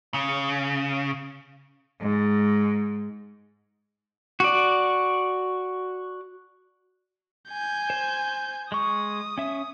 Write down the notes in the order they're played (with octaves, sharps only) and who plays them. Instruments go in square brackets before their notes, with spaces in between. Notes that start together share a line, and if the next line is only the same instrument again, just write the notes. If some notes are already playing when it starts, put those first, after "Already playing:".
[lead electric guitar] C#3
[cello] G#2
[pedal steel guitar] F#4 D5
[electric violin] G#5 G6
[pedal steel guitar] C5
[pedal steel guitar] G#3 C#6 [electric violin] D#6
[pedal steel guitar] C#4 E5